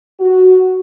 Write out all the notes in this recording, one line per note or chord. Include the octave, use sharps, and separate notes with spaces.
F#4